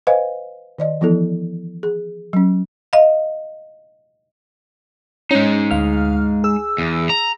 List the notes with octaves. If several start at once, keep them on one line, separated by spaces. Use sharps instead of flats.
B4 C5 D#5 F5 G#5
D#3 D5 D#5
E3 F3 B3 E4 A4
G#4
F#3 C#4
D#5 F5
G#3 C#4 D#4
D2 F5 F6
G#4 E6
E2
A#5